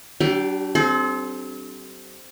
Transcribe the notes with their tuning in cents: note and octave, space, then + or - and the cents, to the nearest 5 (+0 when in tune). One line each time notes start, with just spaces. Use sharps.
F#3 +45 D4 -10 G4 +0
C4 +0 A4 -45